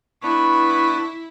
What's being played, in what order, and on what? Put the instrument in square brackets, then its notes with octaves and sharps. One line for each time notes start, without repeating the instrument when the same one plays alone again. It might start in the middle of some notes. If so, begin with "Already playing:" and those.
[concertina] B3 D4 B4 [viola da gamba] E4 [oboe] C#6